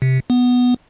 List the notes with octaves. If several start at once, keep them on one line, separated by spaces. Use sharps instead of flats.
C3
B3